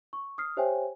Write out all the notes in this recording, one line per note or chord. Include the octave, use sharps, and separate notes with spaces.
C#6
D#6 F6 C7
G4 C5 C#5 E5 G5 G#5